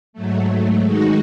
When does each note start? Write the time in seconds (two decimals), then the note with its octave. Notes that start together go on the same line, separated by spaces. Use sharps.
0.13 G#2 F#3 A3
0.82 D#3 G#3 D#4 F#4